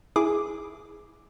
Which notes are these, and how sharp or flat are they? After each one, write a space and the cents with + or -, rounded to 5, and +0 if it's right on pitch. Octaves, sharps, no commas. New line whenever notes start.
E4 +0 G#4 +0 D6 +0